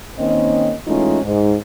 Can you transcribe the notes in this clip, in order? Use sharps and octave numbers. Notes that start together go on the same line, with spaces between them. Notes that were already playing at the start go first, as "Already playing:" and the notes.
D#3 A#3 C4 C#4 D#5
E3 G#3 A3 C#4 D#4 F4
G#2